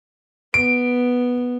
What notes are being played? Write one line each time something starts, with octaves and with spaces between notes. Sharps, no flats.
B3 D7